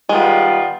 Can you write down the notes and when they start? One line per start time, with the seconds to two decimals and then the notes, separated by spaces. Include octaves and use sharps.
0.09 D#3 G3 G#3 B3 F4